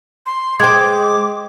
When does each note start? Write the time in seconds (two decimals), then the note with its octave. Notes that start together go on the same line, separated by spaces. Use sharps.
0.26 C6
0.60 G#3 C5 G5 D6 G#6